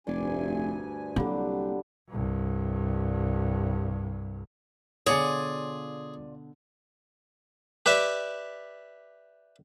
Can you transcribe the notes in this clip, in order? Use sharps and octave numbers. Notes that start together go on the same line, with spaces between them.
F1 D2 G2 D5 G#5 D6
C2 D3 F#3 G3 A#3
C2 G2
B2 D3 F4 G#4 C#5 D5 G#5
G4 B4 D5 E5